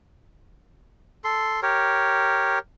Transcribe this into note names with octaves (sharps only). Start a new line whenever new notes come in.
A4 C6
G4 A#4 C#5